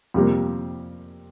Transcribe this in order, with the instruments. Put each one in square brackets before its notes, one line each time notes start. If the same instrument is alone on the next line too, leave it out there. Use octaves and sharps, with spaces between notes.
[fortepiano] F2 C3 G3 A#3